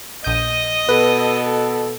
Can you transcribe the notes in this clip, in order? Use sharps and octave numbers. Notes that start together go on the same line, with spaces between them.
A#1 D#5 D#6 G6
B2 A4 B4